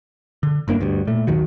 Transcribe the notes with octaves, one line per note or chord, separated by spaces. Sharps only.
D3
F#1 G2 A#3 D4
D2 G2
A#2 A3
G#1 D#2 D#3 F#3